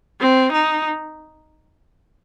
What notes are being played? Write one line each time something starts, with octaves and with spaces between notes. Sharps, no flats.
C4
D#4